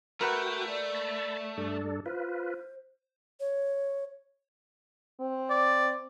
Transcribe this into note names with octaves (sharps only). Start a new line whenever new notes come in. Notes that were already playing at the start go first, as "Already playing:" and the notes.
A3 F#4 A#4 B4 F#5 G5
D5
A5 B5
G2 D4 A4
F4 B4 C5
C#5
C4
D5